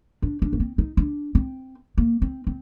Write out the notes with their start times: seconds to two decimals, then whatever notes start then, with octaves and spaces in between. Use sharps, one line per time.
0.22 D4
0.42 D4
0.53 A#3
0.60 C4
0.78 D#4
0.97 D4
1.35 C4
1.98 A#3
2.22 C4
2.47 C4